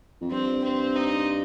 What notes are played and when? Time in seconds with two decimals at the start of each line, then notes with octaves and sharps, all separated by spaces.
0.21 F2
0.31 G2 C4
0.64 C4
0.96 D#4